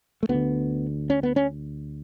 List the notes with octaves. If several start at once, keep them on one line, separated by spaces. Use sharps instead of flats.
A3
D2 B3
D3
C#4
B3
C#4